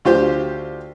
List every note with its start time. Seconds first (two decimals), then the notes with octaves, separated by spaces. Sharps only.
0.05 D2 F4 G4 C5